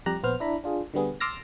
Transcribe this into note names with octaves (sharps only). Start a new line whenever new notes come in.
F2 G3 G4 A#5 F#6
A#1 B3 C5 F6
D4 E4 A#5 B5
D4 F4 G#4
D3 G3 B3 G#4
C6 D6 E6 F6 A6 A#6